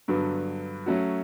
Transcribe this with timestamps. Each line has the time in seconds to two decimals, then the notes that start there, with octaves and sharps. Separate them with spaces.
0.08 G2 D3 F#3 B3 F#4
0.86 F#3 A3 C#4 F#4